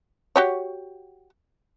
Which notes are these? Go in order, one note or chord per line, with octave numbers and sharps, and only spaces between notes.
F#4 G4 C#5